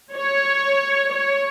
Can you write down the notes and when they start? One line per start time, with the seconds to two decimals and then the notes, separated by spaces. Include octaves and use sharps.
0.12 C#5
1.11 C#5